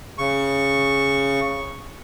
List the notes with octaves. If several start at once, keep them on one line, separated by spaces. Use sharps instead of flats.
C#3 C#6